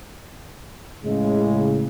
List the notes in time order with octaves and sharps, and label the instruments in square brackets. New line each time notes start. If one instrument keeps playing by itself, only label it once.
[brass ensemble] A2 C#3 G#3